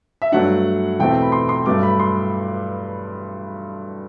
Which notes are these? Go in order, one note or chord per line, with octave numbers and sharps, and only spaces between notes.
E5
G2 F#3 A3 D4 F#5
E2 B2 A3 C4 G5
B5
C6
C6
G2 F#3 A3 D6
B5
C6